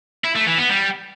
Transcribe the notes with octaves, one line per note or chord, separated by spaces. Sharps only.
E4
A3
E3
B3
G3